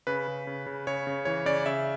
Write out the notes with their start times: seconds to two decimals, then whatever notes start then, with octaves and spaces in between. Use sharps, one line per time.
0.07 C#3 B4
0.28 C#3
0.47 C#3
0.66 C#3
0.87 C#3 C#5
1.07 C#3
1.25 E3 C#5
1.46 C#3 D5
1.66 C#3 E5